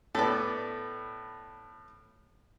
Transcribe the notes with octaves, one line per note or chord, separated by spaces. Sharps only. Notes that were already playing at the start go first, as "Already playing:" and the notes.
A2 B3 A4 D5